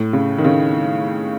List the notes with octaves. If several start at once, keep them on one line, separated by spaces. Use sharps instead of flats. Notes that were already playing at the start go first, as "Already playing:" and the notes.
Already playing: A2
C#3
D#3
C#3